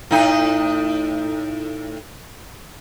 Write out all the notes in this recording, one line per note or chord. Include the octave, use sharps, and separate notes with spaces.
A2 D#4